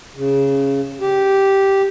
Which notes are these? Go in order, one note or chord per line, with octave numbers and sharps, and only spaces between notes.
C#3
G4